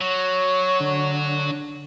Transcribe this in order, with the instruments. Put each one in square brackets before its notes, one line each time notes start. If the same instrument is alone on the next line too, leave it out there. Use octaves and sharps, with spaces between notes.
[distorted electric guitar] F#3 [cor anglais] C#5
[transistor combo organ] D3